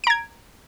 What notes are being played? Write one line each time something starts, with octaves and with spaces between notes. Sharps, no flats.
A#5 G#6 D7